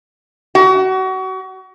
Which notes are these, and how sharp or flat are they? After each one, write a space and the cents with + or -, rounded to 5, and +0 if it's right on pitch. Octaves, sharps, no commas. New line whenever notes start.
F#4 +30